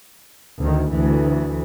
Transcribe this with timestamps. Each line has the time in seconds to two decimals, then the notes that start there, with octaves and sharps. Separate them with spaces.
0.58 D2 D#3
0.90 D2 E3